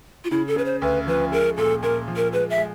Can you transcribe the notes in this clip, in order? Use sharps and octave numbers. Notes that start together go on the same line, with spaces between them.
F4
C#3 E4
A4
C#3 B4
C5
D2 B4
F3 B4
G#3 A#4
A#2 A4
A#2 A#4
F3
A#4
G#3 B4
E5
G#3